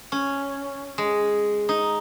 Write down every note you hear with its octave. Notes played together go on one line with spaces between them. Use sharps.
C#4
G#3
D#4